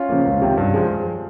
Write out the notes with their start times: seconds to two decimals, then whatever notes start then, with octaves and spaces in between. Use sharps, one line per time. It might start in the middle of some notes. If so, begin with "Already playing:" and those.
Already playing: C#4 F4
0.09 C#3 F3 A#3
0.26 C#2
0.42 C3 D#3
0.57 G2
0.74 F3 G#3